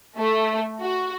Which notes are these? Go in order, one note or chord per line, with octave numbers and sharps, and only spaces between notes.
A3
F#4